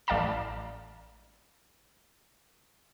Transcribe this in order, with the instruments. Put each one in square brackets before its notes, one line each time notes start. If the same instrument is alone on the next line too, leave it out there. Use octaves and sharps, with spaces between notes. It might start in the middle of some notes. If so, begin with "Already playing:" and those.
[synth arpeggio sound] A1 D5 F5 A5 A#5 E7